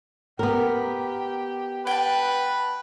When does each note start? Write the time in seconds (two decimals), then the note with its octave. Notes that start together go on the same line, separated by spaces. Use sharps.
0.39 B3 G4 A#4
1.87 B4 F#5 G5 A5